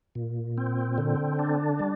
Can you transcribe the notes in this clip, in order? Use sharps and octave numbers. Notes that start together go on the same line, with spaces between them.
A#2
C4
D3
D4
G3